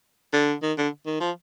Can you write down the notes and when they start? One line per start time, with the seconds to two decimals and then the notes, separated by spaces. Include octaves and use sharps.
0.33 D3
0.62 D#3
0.78 D3
1.06 D#3
1.21 F3